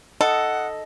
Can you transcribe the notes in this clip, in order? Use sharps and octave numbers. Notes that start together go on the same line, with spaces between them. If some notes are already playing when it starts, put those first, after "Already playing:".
A4 D#5 F#5